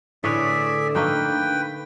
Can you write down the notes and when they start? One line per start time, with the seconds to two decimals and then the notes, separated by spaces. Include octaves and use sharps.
0.24 A2 D3 G#4 B4 C#5 D5 E5
0.95 A3 A#3 D#4 B4 G5